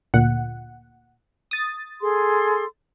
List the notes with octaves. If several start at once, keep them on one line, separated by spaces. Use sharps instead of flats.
D2 A#2 F#5
D#6 A6
G#4 A4 C6